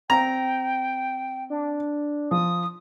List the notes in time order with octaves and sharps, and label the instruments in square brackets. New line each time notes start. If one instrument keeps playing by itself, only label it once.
[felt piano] C4 [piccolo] G5 [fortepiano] A#5
[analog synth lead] D4
[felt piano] F3 [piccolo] D#6